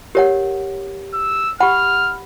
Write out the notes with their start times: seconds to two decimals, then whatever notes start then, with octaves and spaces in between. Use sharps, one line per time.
0.15 G4 A#4 C#5 F#5
1.14 E6
1.60 G4 F#5 B5 F6